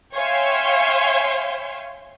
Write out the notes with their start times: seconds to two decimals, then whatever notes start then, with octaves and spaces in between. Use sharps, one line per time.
0.13 C#5 E5 F5 G5 G#5 C6